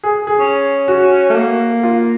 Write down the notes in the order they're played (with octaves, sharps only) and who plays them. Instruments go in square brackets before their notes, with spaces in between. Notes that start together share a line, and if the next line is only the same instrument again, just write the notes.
[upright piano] G#4
G#4
[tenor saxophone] C#4
[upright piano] F#4
[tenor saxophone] A3
A#3
[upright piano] F4